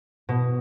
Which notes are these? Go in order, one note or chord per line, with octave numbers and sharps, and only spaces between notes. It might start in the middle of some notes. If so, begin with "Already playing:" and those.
B2